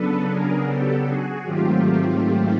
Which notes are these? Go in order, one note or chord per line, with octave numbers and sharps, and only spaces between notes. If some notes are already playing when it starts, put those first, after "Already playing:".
Already playing: C#3 F#3 B3 D4 A4 B4
G#4 A#4
G4 A4
F#4 G#4
G#2 D#3 F#3 A3 C4 F4 G4